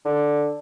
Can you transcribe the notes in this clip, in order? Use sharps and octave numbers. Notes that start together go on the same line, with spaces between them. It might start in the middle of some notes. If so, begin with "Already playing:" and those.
D3